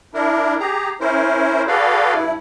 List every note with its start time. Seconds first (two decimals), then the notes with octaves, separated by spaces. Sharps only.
0.14 D4 E4 A#4
0.60 G4 G#4 A#5
1.00 C#4 E4 A#4 C5
1.68 F#4 G#4 A4 B4 D5 F5
2.14 G2 E4